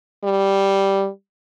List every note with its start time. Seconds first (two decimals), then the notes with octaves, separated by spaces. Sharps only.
0.24 G3